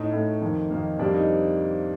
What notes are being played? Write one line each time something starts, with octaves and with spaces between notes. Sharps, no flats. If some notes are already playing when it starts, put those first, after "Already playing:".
Already playing: A2 A3 D#4
A2 A3
F2 D#3 A#3
F2 D#3 A#3
F2 C3 G3 A#3 D4
D#4